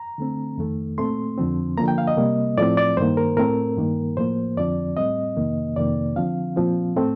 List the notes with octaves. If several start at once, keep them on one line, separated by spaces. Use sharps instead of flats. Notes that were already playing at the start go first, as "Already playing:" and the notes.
Already playing: A#5
D3 A3 C4
F2 D#3 A3
A#2 A3 C4 C6
F2 D3 F3 C4
D3 F3 A#3 A#5
G5
F5
D#5
C3 G3 A#3
A2 F3 C4 D5
D5
G2 D#3 A#3 C5
A#4
A2 A3 C4 A#4
G2 D#3 A#3
A2 F3 A#3 C5
F2 D3 F3 C4 D5
A2 G3 C4 D#5
F2 C3 D#3 A#3
F2 C3 D#3 A#3 D5
D3 F3 C4 F5
A#2 F3 C4
A2 A3 C4